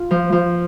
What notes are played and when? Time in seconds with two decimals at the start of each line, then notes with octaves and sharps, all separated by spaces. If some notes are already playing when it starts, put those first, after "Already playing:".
Already playing: F4
0.11 F3
0.32 F3